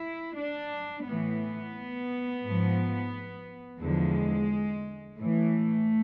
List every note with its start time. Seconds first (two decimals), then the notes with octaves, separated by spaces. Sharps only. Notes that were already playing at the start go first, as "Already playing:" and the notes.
Already playing: E4
0.35 D4
1.05 A2 E3 B3
2.43 G#2 F3
3.80 E2 D3 F3 G#3
5.17 A2 E3 A3